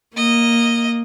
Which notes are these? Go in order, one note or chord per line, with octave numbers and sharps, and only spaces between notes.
A#3 D#5